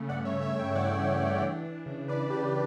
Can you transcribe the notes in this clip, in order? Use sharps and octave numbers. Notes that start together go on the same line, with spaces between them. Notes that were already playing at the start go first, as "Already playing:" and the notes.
Already playing: C#3 A3
G2 D5 F#5
C#5 E5
A3
C#5 E5
G2
E5 G5
E3 D5 F#5
E3
E3
D4
D4
C#3
C#3 B4 D5
C#3 G4 B4